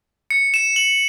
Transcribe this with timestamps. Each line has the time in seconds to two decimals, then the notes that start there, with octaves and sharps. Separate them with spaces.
0.31 C#7
0.54 E7
0.76 F#7